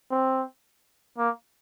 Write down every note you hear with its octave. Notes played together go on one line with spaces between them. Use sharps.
C4
A#3